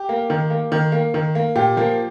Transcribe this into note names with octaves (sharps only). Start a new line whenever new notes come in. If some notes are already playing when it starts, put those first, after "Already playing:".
Already playing: G4
A#3
D#3
A#3
D#3
A#3
D#3
A#3
A#2 G4
F3 A#3